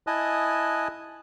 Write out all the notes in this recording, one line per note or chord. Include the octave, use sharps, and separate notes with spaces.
E4 D#5 G#5 A5 D#6 F#6